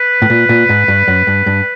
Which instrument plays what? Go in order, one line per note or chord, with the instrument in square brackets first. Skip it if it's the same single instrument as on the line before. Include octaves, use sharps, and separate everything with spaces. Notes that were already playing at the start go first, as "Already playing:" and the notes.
Already playing: [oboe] B4
[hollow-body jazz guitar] A2
A#2
A#2
G#2
G2
F#2
G2
G2